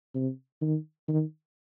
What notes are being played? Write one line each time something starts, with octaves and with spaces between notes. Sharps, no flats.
C3
D#3
D#3